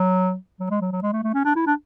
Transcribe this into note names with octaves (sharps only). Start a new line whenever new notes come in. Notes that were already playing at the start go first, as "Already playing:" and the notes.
Already playing: F#3
F#3
G#3
F#3
F#3
G#3
A3
A3
C#4
D4
E4
D4